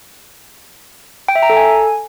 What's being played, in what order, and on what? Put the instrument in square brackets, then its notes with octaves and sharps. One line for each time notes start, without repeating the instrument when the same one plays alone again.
[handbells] G5
E5
A#5
A4
G#5